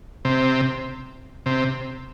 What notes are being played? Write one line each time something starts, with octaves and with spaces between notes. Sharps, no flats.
C3
C3